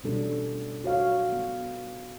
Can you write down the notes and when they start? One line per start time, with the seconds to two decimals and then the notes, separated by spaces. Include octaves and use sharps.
0.04 B2 E3 G3 C#4 D4 A4
0.84 F#4 C#5 F5
1.32 B3